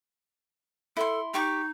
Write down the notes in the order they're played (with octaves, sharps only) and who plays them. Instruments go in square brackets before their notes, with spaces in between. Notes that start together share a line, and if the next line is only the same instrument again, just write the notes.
[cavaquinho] E4 C6 [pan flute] A4
[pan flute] D#4 [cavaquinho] G4 C#6 D6